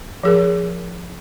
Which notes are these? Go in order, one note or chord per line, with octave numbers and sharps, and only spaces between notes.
F3 G#4 A#4